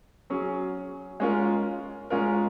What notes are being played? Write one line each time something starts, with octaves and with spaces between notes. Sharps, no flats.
F#3 C#4 G#4
G#3 C#4 F4 A#4
G#3 C#4 F4 A#4